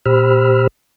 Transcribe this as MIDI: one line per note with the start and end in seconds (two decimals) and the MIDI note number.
0.06 0.67 46
0.06 0.67 67
0.06 0.67 72
0.06 0.67 83
0.06 0.67 88
0.06 0.67 89